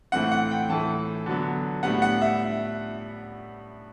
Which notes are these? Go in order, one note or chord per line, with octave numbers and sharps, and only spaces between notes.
A2 E3 A3 C4 F#5
F#5
G5
A2 E3 A3 A5
D3 F#3 B3
A2 G3 B3 F#5
F#5
E5